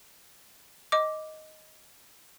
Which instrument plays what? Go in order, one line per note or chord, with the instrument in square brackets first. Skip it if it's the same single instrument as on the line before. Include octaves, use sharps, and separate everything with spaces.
[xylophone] D#5 D6